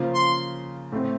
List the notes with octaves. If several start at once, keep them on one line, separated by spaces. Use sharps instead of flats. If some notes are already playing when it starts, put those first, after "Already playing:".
Already playing: C#3 F3 A#3 F4 C5
C6
A2 A3 C4